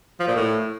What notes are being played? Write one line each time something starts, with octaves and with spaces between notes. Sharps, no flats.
F3
A#2
A2